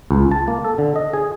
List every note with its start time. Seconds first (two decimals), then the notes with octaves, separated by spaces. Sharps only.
0.11 C#2
0.31 A5
0.48 A#3
0.65 A4
0.78 D3
0.96 D#5
1.13 G#4